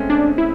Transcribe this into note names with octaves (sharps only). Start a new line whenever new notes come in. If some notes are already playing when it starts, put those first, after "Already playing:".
Already playing: G#3 A3 C4 C#4
D4
E4